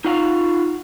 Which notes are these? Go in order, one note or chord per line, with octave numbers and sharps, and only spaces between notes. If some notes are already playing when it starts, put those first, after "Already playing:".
D#4 F4 F#4 F5 F#5 A#5